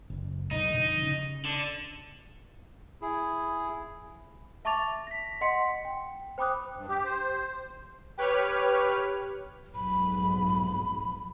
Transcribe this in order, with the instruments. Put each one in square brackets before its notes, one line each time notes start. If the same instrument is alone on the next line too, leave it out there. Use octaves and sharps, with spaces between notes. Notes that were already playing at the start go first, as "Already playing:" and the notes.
[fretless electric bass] F#1
[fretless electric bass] B1 [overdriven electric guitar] D#4
[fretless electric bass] F2 D3 G3
C#3
[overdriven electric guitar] D3
[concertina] E4 G#4
[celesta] E5 A5 C#6 D6 A6 F7
A#6 B6
D#5 F#5 C6 B6 C#7
G5
C5 G5 B5 D6 D#6 F#6
[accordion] G2
G4
C5
[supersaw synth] G4 B4 C#5 F6
[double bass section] B1 F2 G#2 [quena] B5